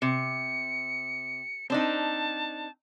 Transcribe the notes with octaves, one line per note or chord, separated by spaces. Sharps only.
C3 C#7
C4 D4 D#4 A5